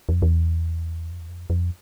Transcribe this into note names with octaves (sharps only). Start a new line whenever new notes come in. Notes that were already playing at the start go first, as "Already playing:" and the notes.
E2
F2
E2
F2
E2
F2
F2